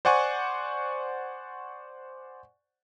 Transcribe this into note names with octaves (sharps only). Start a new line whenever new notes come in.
C5 D5 F#5 G#5 C#6